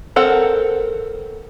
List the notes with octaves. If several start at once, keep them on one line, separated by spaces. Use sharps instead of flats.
C4 A4 A#4 F#5